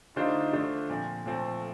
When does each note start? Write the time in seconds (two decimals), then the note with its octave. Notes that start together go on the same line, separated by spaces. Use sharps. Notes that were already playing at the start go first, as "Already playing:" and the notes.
0.16 D3 A3 D4 D#4 F4 C5
0.53 D3 A3 D4 F4 C5
0.90 A#2 F3 C4
1.25 A#2 F3 A3 C4